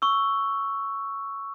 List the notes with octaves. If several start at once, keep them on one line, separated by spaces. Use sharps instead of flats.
C#6 E6